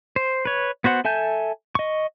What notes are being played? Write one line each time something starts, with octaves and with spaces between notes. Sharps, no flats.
C5
B4 C#5
B3 F#4 C5 F#5
A4 E5 G#5 A5 G6
D#5 C#6